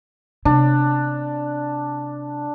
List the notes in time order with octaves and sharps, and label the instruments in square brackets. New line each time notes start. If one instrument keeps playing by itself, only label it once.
[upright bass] C3 [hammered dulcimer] D4